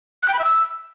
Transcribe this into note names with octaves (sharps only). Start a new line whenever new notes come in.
F#6
G5
B5
E5
E6